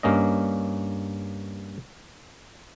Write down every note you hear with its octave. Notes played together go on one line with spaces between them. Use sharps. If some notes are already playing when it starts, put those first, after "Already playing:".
G2 A#3 C#4 D#5